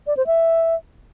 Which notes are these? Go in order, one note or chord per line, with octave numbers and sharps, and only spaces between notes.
D5
C5
E5